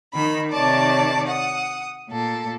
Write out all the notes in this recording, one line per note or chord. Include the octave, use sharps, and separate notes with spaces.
D#3 B5
C3 D#3 C#5 D5 A5 D6
F#5 D#6
A#2 A4